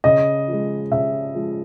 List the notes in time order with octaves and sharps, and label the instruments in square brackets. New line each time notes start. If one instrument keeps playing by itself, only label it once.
[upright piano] C#3 [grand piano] D#5
[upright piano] F3 G#3
[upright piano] C#3 [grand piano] E5
[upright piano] F3 G#3